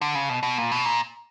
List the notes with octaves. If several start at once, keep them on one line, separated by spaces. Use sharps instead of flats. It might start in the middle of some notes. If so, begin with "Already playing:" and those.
D3
C#3
B2
B2
A#2
B2
A#2